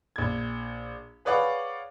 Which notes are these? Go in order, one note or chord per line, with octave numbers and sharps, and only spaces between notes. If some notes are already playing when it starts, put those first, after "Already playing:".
A#1 G#6
G#4 B4 C#5 D5 F5 F#5